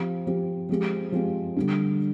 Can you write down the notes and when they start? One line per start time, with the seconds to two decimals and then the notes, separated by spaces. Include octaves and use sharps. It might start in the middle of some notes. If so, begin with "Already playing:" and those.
Already playing: F3 C4 G4
0.26 F3 C4 G4
0.69 F3 G#3 C4 G4
1.12 F3 G#3 C4 G4
1.56 D3 G3 D4